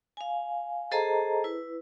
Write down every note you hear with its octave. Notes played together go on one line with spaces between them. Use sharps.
F5 G#5
G#4 A4 C5 D#5 A5 A#5
E4 B4